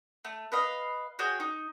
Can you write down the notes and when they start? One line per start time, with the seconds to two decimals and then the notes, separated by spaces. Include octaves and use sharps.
0.25 A3
0.52 B4 D#5 F5
1.19 F#4 G#4 C#5 G5
1.40 D#4